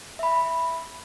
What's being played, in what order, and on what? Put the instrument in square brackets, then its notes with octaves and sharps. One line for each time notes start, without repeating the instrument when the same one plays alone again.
[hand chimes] E5 B5